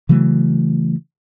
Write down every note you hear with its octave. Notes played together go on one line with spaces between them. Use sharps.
C#3 E3 F#3 A3